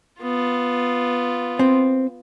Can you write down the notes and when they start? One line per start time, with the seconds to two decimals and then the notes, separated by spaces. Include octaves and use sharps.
0.21 B3 F4
1.59 C4